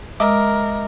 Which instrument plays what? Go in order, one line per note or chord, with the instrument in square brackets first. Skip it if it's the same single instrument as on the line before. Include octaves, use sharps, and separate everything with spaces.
[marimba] G#3 [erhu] A#4 [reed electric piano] D#5 E5 D6